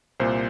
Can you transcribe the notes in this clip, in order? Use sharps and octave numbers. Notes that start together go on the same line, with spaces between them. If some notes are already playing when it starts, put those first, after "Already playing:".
C2 A#2 C5